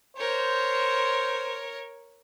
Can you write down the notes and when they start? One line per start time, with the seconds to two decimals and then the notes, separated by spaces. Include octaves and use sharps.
0.17 A#4 C5 C#5